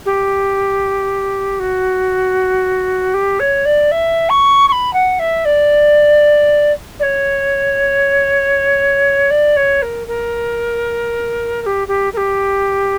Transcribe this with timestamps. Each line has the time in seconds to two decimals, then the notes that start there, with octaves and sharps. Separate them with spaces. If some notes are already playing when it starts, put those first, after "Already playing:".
0.06 G4
1.60 F#4
3.14 G4
3.40 C#5
3.65 D5
3.91 E5
4.30 C#6
4.68 C#6
4.72 B5
4.93 F#5
5.19 E5
5.45 D5
6.99 D5
7.03 C#5
9.30 D5
9.56 C#5
9.82 A#4
10.08 A#4
11.62 A#4
11.66 G4
11.88 G4
12.13 A#4
12.17 G4